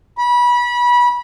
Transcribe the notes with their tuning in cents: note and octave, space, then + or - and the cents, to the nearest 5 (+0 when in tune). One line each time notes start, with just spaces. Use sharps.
B5 -25